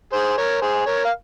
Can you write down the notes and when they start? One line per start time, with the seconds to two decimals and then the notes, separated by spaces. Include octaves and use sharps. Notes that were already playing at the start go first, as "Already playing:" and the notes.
0.13 G#4 C5
0.38 A#4 C#5
0.62 G#4 C5
0.86 A#4 C#5
1.05 F5